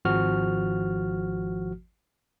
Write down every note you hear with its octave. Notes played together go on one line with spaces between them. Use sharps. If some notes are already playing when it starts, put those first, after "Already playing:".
G#1 F3 F#4 F6